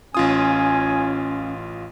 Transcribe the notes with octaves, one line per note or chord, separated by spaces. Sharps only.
A1 C#4 F4 G#5 D#6